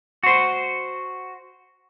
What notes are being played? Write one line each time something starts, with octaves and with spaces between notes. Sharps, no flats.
F#4 C5